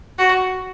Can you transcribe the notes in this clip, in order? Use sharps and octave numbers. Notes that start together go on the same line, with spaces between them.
F#4